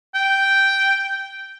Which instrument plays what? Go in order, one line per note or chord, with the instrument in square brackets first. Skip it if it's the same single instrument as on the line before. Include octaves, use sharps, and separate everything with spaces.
[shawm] G5